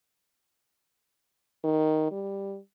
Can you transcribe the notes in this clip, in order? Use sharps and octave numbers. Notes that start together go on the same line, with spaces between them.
D#3
G3